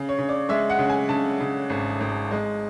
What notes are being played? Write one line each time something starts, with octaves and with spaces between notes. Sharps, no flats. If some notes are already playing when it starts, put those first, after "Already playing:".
Already playing: C#3
C#5
C#3
D5
G#3 E5
F#5
C#3
G#5
C#3 A5
C#3
G#1
G#1
G#3